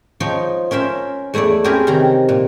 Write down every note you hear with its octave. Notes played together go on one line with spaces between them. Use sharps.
F3 D#4 C#5 G5
C#4 A#4 C5 E5
E2 A3 E4 C#5 D5
C4 C#4 E4 G4 G#4 A#4
C3 D#3 A#5
A#2